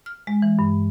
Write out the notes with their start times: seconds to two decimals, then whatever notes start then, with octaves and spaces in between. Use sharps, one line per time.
0.06 F6
0.27 G#3
0.42 E3
0.59 G2